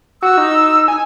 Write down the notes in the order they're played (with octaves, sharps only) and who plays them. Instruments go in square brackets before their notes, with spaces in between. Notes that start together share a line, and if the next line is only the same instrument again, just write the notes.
[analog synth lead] F#4 [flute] E6
[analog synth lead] D#4
G#5